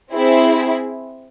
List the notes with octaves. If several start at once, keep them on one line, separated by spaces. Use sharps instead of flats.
C4 E4 G#4